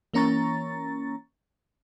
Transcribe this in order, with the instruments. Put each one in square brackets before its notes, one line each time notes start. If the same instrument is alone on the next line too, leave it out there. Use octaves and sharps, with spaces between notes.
[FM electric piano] E3 A#3 C#4 A#5 C#6 A6